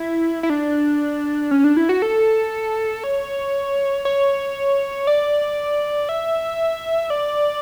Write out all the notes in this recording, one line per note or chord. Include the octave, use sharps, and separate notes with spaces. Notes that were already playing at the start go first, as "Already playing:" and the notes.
Already playing: E4
E4
D4
C#4
D4
E4
F#4
A4
C#5
C#5
D5
E5
D5